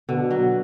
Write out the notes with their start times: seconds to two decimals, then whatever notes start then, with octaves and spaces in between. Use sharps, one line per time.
0.09 B2 D3
0.31 F#3